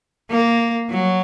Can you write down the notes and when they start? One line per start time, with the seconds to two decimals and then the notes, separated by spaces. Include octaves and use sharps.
0.30 A#3
0.91 F#3